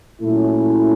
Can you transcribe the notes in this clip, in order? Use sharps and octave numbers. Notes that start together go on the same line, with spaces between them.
A#2 F#3 A3 C#4 E4